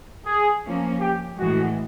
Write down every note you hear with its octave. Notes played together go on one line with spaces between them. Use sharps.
G#4
F3 A#3 C#4
G4
A2 E3 G#3 F#4